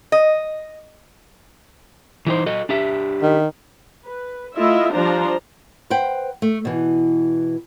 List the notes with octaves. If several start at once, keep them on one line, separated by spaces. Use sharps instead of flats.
D#5
E3 D#4 C5
F#4 A4 D#5
D4 G4 E5
D#3
B4
A3 E4 F4 D#5 E5
F3 G3 D4 C5 A#5
B4 C5 F#5 G5
A3
B2 E3